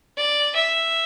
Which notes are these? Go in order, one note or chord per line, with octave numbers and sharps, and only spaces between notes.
D5
E5